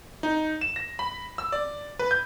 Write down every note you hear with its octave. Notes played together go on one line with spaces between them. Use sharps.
D#4
E7
A#6
B5
E6
D5
B4
G6